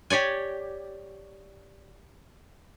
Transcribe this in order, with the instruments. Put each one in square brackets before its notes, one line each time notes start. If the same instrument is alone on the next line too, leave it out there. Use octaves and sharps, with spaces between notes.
[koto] G4 C#5 D5 G#5